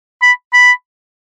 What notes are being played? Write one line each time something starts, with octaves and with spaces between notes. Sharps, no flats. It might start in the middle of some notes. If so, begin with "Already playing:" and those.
B5
B5